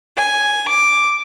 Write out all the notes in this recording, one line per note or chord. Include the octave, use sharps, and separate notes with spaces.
G#5
D6